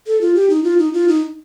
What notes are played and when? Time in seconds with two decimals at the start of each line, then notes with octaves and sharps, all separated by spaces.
0.07 A4
0.21 F4
0.35 G4
0.50 D#4
0.64 F4
0.79 D#4
0.93 F4
1.08 D#4